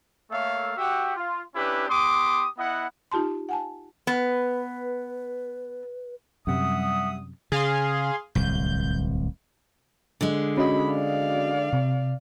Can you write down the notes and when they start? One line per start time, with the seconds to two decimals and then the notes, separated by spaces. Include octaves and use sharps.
0.31 A3 A#3 A4 C#5 E5 F5
0.77 F#4 G4 E5 F#5 G5
1.16 F4
1.54 C#4 D4 E4 G4 B4
1.89 B3 G4 C6 D6 D#6
2.57 B3 E4 D#5 F#5
3.12 D#4 F4 G4 A5 C6
3.49 F#5 G#5 A5
4.07 B3 B4
6.47 F#2 C3 G3 E5 F#5 D#6
7.52 C#3 G#4 F5 C6
8.35 D1 C2 G6
10.21 D3 G#3
10.57 C#4 F#4 D#5 B5
10.91 D5 F5
11.73 C3